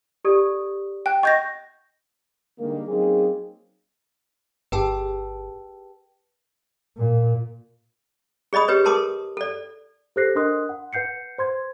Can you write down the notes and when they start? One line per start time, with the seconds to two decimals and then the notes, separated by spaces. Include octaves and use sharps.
0.25 G4 A4 D5
1.06 G5 F#6
1.23 D#5 F#5 C#6 G6 A#6
2.59 D3 D#3 G3 G#3 A#3
2.88 F#3 A#3 C4 C#4 D#4 G#4
4.72 G1 G4 G#4 B4 G5 A5
6.97 A#2
8.53 G#4 D5 D#5 B5 D#6
8.68 G4 G#4 B4 C#5 D#5
8.85 G#4 A#4 A5 C6 D6 D#6
9.37 A4 D5
10.16 G4 A4 C5 F#6 A#6 C7
10.35 D4 A#4 D#5 C6 D#6 F#6
10.69 F#5
10.93 B4 F#5 G6 C7 C#7
11.38 C5 C6 G#6